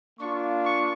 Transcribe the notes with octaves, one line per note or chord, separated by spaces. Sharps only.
A#3 D4 F4 C#6
C#6